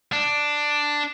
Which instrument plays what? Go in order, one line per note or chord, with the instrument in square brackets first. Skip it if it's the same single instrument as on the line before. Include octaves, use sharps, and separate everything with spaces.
[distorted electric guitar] D4